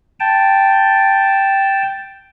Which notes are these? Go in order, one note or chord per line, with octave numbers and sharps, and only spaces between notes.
G5 A5